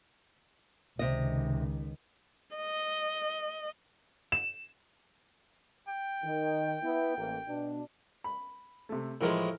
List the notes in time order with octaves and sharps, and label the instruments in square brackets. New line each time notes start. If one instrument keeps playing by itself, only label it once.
[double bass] C#2 D#3 [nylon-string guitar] C3 D#5
[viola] D#5
[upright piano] E7
[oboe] G5
[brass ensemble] D#3
B3 E4
A1 A#3
B2 D4
[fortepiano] B5
C3 A3
[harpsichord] A2 F3 G#3 [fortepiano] E3 A#4